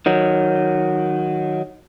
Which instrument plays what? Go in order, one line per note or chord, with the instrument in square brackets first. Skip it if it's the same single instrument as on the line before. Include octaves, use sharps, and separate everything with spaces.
[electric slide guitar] D#3 F#3